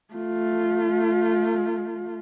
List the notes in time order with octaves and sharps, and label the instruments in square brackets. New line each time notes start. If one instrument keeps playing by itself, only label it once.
[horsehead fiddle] A3 F4